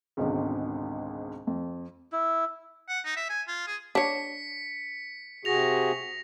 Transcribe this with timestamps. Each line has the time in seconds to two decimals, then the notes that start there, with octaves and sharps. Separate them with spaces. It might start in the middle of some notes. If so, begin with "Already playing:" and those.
0.17 G#1 C#2 G#2 B2 D3 D#3
1.47 F2
2.12 E4
2.89 F#5
3.05 D#4
3.16 E5
3.30 G#5
3.48 F4
3.68 G#4
3.95 D4 C#5 B6 C#7
5.45 C3 F#4 G#4 A#6 F7